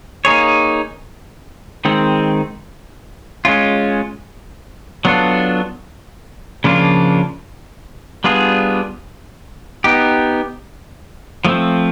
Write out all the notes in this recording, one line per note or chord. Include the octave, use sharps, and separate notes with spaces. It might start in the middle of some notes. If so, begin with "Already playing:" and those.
A#3 D#4 G#4 C#5
D#3 G#3 C4
G#3 C#4 F4
F#3 B3 D4 F4 A4
C#3 F3 A#3 D4 F4
G3 B3 D4 F4 G#4
B3 D#4 G4
F3 A3 C4